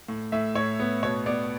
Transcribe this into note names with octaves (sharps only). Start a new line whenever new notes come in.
A2
A2 E5
A2 C#5
B3
B2 C#5
B3 D5